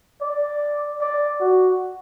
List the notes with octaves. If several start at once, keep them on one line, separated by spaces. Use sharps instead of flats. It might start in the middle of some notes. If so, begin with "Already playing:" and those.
D5
D5
F#4